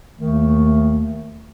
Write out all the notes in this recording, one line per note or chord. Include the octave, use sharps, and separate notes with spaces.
D#2 D#3 A3